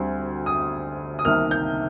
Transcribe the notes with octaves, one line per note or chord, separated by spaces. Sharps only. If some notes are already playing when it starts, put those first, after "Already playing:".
Already playing: D2 D3 G3 C4
D#6
D#6
C2 C3 D#3 A#3 F6
G6